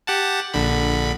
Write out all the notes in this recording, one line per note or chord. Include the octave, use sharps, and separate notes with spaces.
G4 F#5 A5
A#1 D3 B5